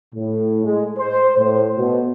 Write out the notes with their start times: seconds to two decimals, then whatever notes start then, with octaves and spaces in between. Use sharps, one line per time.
0.15 A2
0.65 G#3
0.98 C5
1.38 A2
1.77 B2